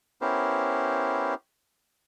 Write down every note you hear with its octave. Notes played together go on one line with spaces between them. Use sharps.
B3 C#4 E4 G4 A#4 C5